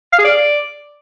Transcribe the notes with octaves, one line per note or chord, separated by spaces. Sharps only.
F5
G#4
D5